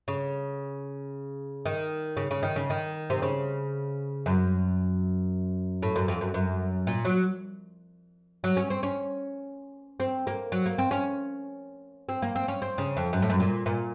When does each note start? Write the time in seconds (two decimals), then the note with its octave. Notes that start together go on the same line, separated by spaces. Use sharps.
0.08 C#3
1.66 D#3
2.17 C#3
2.31 C#3
2.43 D#3
2.56 C#3
2.70 D#3
3.10 C3
3.22 C#3
4.26 F#2
5.82 A2
5.96 F#2
6.08 F2
6.21 F#2
6.34 F#2
6.87 A#2
7.05 F#3
8.44 F#3
8.57 C#4
8.70 C4
8.83 C#4
10.00 C4
10.27 A#3
10.52 F#3
10.66 A#3
10.78 C4
10.91 C#4
12.09 C4
12.22 A#3
12.36 C4
12.48 C#4
12.62 C4
12.78 C#3
12.97 F2
13.13 F#2
13.22 A2
13.30 F#2
13.40 A#2
13.66 A#2